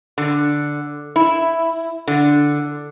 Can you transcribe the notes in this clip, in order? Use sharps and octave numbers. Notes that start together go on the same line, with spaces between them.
D3
E4
D3